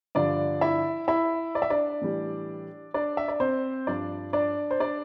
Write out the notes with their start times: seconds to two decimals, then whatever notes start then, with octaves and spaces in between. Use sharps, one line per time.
0.15 G2 D3 F3 D4 D5
0.61 E4 E5
1.08 E4 E5
1.55 D5
1.62 E5
1.70 D4 D5
2.01 A2 E3 G3
2.94 D4 D5
3.17 E5
3.28 D5
3.40 C4 C5
3.87 G2 F3 D4 D5
4.33 D4 D5
4.71 C5
4.80 D4 D5